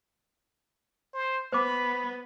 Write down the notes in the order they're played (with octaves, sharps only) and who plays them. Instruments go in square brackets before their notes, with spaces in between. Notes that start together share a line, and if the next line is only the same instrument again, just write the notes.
[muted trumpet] C5
[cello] B3 [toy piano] C5 D6 [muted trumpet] B5